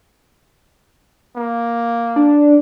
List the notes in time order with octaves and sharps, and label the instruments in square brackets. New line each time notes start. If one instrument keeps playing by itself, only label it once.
[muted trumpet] A#3
[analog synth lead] D4